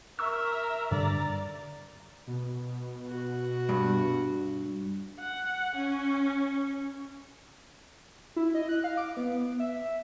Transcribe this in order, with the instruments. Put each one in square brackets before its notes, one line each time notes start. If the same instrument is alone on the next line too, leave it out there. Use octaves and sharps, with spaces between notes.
[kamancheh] A#4 E5 [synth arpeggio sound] C#6 E6
[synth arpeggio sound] G2 D3 [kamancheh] D5 A#5
[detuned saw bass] B2
[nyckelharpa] F#4
[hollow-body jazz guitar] G2
[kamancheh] F#5
C#4
[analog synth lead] E4
D#5
F#6
F5
D6
B3
E5